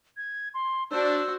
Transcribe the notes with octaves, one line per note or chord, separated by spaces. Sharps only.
G#6
C6
D4 F#4 C5 E6